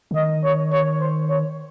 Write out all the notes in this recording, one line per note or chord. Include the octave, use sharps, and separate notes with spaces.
C#3
D#3 D#5
C#5
C#5
C5
C#5